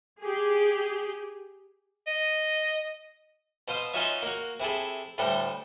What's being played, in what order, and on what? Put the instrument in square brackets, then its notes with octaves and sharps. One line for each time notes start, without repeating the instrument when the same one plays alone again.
[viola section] G4 G#4
[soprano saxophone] D#5
[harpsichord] B2 C5 F5 D#6
C#4 D#4 F4 F#4 C#5 E5
A#3 F#4
C3 E4 G#4 A4
D2 A2 G3 A4 F#5 G5